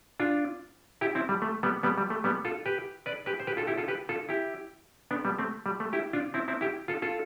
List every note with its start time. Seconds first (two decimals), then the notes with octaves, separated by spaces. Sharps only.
0.20 D4 F4
1.01 E4 G4
1.15 C4 E4
1.29 G3
1.42 A3
1.63 G3 B3
1.83 G3 B3
1.98 G3
2.10 A3
2.24 G3 B3
2.45 F4 A4
2.66 G4 B4
3.06 B4 D5
3.26 G4 B4
3.40 C5
3.47 G4 B4
3.57 F4 A4
3.67 E4 G4
3.78 F4 A4
3.88 G4 B4
4.09 F4 A4
4.29 E4 G4
5.11 B3 D4
5.25 G3 B3
5.39 A3 C4
5.66 G3
5.80 A3
5.93 E4 G4
6.13 D4 F4
6.34 C4 E4
6.48 C4 E4
6.61 E4 G4
6.88 F4 A4
7.02 F4 A4